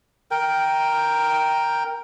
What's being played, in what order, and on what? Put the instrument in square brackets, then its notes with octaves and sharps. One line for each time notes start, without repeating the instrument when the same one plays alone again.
[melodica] A#4 G5